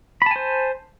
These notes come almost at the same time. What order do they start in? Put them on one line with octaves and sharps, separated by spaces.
B5 A5 G#5 C5